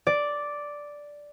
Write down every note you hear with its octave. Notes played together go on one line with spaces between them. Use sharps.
D5